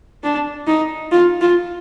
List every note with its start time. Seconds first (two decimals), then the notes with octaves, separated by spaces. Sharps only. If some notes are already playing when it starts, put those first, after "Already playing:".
0.23 D4
0.67 D#4
1.12 F4
1.41 F4